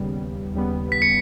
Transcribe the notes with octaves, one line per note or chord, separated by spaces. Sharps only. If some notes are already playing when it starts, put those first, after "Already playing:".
Already playing: D#2 C#3 G3 B3
D#2 C#3 G3 B3
B6
C#7